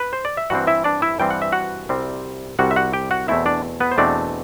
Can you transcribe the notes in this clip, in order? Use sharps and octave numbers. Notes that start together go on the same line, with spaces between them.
B4
C5
D5
E5
G2 E3 G3 C4 F#4 F#5
E4 E5
D4 D5
E4 E5
G2 E3 G3 C4 G5
F#5
E5
F#4 F#5
C2 C3 G3 C4
C2 C3 G3 C4 F#4 F#5
E5
F#4 F#5
G4 G5
F#4 F#5
E2 B2 A3 C4 E4 E5
D4 D5
B3 B4
C5
E2 B2 A3 C4 D4 D5